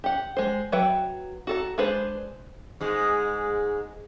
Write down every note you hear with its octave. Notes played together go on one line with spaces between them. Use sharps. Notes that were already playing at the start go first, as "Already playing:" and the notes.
G4 F#5
G#3 C5
F#3 B4 E5 F#5 G5
F#4 A4 A#5
G#3 D4 G#4 B4 C5
G#2 G#3